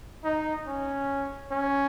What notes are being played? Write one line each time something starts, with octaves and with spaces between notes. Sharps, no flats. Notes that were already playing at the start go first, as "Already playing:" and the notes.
D#4
C#4
C#4